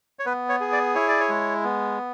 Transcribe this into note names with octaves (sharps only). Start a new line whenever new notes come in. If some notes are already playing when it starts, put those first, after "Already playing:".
C#5
B3 B4
C#5
G#4
D5
E4 C#5
D5
C#5
G#3
B3